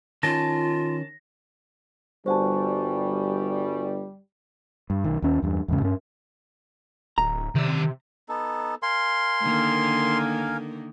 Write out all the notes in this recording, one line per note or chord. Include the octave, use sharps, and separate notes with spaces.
D#3 C#4 F4 A5 A#6
G1 G3 F#4 C5 F#5 G#5 A5 C#6
G2
B1 D#3
D#2 C#4
E2 G2
E2 G#2 C#3
G2 C#4
D1 A#5
C3 D#3 D5
B3 D#4 A4
A#4 F5 G#5 C6
D3 D#3 A#3